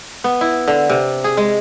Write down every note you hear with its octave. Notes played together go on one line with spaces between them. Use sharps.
B3
E4
D3
C3
G#4
G#3